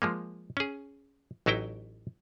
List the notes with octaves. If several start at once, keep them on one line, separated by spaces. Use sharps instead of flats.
F3 G#3 A#3
C#4 G#4
A1 F#3 D#4 E4 G5